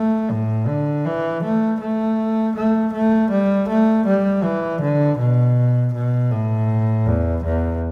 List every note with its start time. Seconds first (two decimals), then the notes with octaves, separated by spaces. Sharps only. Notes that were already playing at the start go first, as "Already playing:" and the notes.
Already playing: A3
0.30 A2
0.67 D3
1.06 E3
1.43 A3
1.81 A3
2.56 A3
2.93 A3
3.30 G3
3.68 A3
4.06 G3
4.43 E3
4.81 D3
5.18 B2
5.93 B2
6.31 A2
7.06 E2
7.44 E2